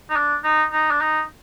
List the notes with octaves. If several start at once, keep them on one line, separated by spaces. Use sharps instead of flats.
D#4
D4
D#4
D#4
D4
D#4